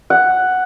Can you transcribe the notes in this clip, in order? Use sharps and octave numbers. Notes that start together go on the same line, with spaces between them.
F#5